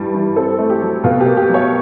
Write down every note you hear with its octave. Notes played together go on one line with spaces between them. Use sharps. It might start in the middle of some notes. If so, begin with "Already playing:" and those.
Already playing: G2 E3 G3
E3
C4 A4
A3
G4
F#3
B2 F4
G4
A#3
G4
F#3
C#5